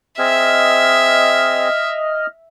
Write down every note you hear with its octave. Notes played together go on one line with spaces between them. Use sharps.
C4 G#4 D#5 E5 F6